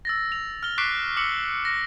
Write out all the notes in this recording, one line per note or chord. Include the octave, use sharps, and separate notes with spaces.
E6 A6 A#6
F7
F6 G7
C#6 D6 F#6 B6 C7 D7
D6 E6 C#7 F#7
A#6